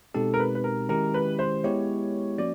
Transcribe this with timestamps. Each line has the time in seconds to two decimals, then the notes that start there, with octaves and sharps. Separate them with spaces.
0.14 B2 G#3 C4 D#4 G4 A4
0.34 A#4
0.40 B4
0.55 B4
0.64 A#4
0.89 D#3 G#3 C#4 E4 G4 A#4
1.14 B4
1.39 C5
1.64 G#3 B3 E4 G4 C#5
2.38 F3 A#3 C#4 F#4 D5